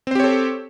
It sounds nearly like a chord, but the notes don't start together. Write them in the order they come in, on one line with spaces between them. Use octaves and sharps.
C4 C5 G4 C#5 A4